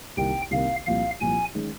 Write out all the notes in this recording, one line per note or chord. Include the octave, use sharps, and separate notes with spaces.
C2 C3 D#3 A#3 D#4 G5
C2 C3 D#3 A#3 D#4 F5
C2 A#2 F3 F5
C2 A#2 F3 G#5
D#3 G#3 C#4